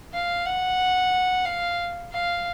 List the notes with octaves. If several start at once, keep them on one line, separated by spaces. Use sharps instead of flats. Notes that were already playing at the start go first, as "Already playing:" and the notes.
F5
F#5
F5
F5